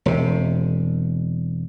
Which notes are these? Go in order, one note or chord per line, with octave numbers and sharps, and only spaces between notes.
E1 C3